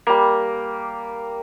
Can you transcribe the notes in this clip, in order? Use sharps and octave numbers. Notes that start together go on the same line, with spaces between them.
G3 A#3